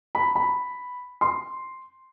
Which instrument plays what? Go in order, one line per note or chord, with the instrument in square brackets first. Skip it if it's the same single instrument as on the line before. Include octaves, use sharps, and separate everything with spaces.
[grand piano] B5
B5
C6